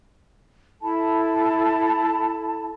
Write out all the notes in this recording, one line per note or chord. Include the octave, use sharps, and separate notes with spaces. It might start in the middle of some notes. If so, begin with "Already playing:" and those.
E4 A4 A5 B5